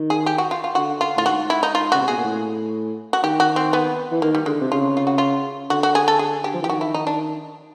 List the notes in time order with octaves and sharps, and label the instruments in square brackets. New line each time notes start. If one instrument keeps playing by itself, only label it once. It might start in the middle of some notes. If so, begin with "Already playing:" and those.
Already playing: [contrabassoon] D#3
[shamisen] G#4
G4
F#4
F4
F4
[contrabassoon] D3 [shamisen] F#4
[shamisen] F4
[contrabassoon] A2 [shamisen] F4
[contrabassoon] G#2 [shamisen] F#4
[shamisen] E4
D#4
F4
[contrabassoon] C#3 [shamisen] F#4
[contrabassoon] C3
[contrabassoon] B2 [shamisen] G#4
[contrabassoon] A#2
A2
[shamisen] F#4
[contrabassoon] D#3 [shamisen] G4
[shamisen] F#4
C4
B3
[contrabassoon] E3
[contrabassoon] D#3 [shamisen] A#3
[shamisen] G3
[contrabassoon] D3 [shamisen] G#3
[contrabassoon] C3
[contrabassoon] C#3 [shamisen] F4
[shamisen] F4
F#4
F4
[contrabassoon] D3 [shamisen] F#4
[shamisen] F#4
G#4
A4
G#4
G4
[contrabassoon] F3
E3
[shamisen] G4
[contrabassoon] D#3 [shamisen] F#4
[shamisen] E4
D#4
D4